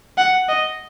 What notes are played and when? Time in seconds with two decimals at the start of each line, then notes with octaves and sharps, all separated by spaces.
0.18 F#5
0.49 D#5